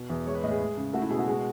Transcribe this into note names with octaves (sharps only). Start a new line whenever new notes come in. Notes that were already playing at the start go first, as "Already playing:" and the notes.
Already playing: B2
E2
G#3 C#5
B4
A2 D#5
G#4
G#3
C#3
A3 F#4
E4
B2 G#4
F#4
G#3